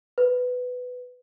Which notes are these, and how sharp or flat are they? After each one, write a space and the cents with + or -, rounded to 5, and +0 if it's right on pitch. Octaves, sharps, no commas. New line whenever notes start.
B4 +10